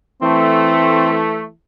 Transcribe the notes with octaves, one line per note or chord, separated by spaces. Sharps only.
E3 A3 C4